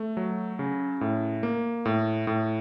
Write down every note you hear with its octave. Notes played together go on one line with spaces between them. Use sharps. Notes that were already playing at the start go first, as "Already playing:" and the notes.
Already playing: A3
F#3
C#3
A2
A#3
A2
A2